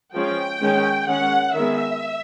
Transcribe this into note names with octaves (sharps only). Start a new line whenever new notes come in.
F3 G#3 C#4 G5
D#3 G#3 C#4
D#3 G#3 C#4 F#5
D#3 G#3 B3 E5